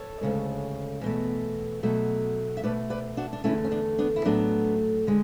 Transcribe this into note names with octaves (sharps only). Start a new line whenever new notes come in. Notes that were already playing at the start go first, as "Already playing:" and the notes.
Already playing: A4 C#5
D2 C#3 G#3
E2 B2 A3
B2 F#3 A3
E5
B2 A3 B4 D5
B4 D5
D4 F#4
D4
E2 D3 A3 C#4 E4
C#4
B3 D4
B3 D4
E4
A2 F#3 A3 B3 D4
D3 G#3